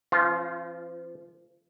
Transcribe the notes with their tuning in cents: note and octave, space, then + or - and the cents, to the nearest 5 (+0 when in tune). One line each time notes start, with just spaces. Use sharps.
F3 -35 C4 +45 F4 +0